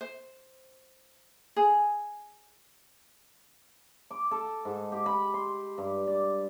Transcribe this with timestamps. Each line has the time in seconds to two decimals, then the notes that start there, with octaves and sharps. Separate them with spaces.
0.01 C5
1.56 G#4
4.11 D6
4.31 A4
4.65 G#2
4.92 G4
5.06 B5
5.34 C6
5.78 G2
6.07 D5